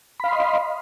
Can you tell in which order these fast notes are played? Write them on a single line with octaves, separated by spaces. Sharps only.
B5 F5 C6 D#5